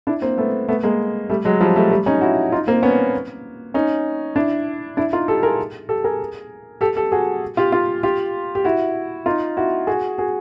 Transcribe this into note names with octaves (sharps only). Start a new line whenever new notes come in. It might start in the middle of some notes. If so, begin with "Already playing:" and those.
D4 E4
A#3 C4
A3 B3
A3 B3
G#3 A#3
G3 A3
F#3 G#3
F3 G3
G3 A3
G3 A3
C#4 D#4
E4 F#4
D#4 F4
A#3 C4
B3 C#4
C#4 D#4
D4 E4
D4 E4
D#4 F4
G4 A4
G#4 A#4
G4 A4
G#4 A#4
G4 A4
G4 A4
F#4 G#4
F4 G4
F4 G4
F4 G4
G4
E4 F#4
D#4 F4
E4 F#4
F#4 G#4
F#4 G#4